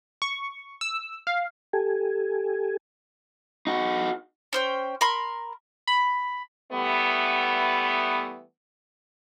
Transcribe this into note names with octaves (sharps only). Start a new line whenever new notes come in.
C#6
E6
F5
G4 A4 G#5
D#4 F#4
C#4 C5 G5
A#4 B5 C6
B5
E3 G3 A3 B3